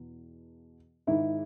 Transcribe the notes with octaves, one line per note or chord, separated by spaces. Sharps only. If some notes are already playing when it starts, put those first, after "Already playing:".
Already playing: E2 B2
G#2 D#3 G#3 E4